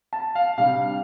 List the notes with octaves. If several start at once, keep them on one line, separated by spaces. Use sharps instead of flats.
A5
F5
C3 G3 D4 F5